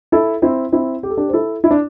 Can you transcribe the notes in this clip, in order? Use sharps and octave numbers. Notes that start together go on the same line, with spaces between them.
E4 A4
C4 E4
C4 E4
G4
A4
D4 G4
C5
E4 A4
E4
D4